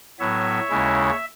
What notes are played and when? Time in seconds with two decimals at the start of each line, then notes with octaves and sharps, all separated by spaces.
0.19 A2 F#3 B3 C#5 E5
0.70 D#2 C#3 G#3 C#4 E4